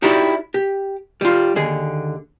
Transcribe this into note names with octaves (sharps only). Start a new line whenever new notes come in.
D#4 E4 F#4 G4 D5
G4
G3 F4
D#2 D3 G#4